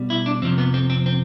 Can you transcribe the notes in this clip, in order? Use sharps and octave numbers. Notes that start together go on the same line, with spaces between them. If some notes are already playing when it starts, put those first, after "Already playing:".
Already playing: B2 G3
E4
D4
F2 C3 F3 C4
B3
C4
C4
C4